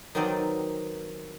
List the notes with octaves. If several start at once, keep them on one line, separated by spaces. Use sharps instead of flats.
D#3 F#3 B3 C4 D#4 D5